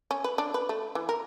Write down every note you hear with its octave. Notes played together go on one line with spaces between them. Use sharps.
C#4
B4
D4
B4
A3
E3
A#4